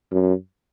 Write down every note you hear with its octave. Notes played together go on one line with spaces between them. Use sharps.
F#2